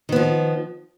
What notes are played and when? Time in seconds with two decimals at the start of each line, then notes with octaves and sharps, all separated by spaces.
0.09 D#3
0.12 B3
0.16 F3